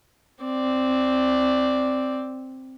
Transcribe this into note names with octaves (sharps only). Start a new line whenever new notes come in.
C4 D5